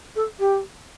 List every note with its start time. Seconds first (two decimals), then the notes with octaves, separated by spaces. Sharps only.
0.16 A4
0.40 G4